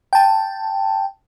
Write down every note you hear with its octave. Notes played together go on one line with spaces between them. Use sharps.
G5 A5